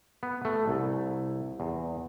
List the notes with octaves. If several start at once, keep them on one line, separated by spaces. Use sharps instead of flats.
B3
A3
C2
E2